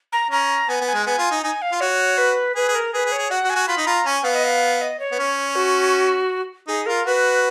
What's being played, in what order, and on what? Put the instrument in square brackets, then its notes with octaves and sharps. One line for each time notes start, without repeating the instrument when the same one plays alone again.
[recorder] A#5
[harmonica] C#4 [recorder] A#5
[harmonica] B3 [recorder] G#5
[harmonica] B3
[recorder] G#5
[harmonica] G#3
[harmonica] B3 [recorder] G#5
[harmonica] F4
D#4
[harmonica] D#4 [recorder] G#5
[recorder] F5
[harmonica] F4
[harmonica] F#4 [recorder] C#5
[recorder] B4
[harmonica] G#4 [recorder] B4
[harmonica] G#4
[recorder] A#4
[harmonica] G#4 [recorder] B4
[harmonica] G#4
[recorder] C#5
[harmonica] G#4
[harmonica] F#4 [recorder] F#5
[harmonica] F#4
[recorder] G#5
[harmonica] F#4
[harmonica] F4 [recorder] B5
[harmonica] D#4
[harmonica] F4 [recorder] A#5
[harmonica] C#4 [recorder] G#5
[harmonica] B3 [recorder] F5
[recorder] D#5
F5
D#5
C#5
[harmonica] B3
C#4
[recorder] F#4
[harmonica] D#4 [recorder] G#4
[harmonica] F4 [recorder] A#4
[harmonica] F#4 [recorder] B4